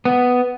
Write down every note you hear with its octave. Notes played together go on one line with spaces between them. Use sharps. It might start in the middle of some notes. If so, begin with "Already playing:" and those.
B3